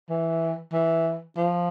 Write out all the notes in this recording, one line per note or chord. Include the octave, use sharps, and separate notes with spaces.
E3
E3
F3